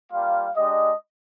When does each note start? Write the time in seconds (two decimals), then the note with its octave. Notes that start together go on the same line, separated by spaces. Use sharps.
0.11 G3 A#3 F4 F5
0.56 G#3 D4 G4 D#5